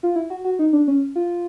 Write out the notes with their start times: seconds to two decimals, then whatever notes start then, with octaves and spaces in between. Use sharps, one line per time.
0.03 F4
0.16 E4
0.30 F#4
0.45 F#4
0.59 D#4
0.73 D4
0.88 C#4
1.16 F4